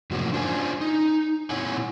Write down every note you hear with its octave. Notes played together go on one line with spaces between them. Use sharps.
F#2 A2 C3 F3 A#3 F#4
C#4 D4 F4 C5 F5 G#5
D#4
A#2 C4 E4 C#5 F#5 G#5